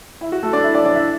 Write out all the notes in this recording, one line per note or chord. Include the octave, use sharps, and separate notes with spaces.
E4
F#4
A3 A4
D4 D5
E4 E5
D4 D5
D4 D5
E4 E5